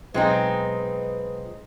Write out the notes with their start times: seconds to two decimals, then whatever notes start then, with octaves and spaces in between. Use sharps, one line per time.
0.14 B1 G#3 C4 D#4 F4 B4 C6